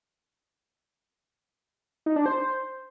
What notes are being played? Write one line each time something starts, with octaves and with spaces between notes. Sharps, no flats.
D#4
D4
C5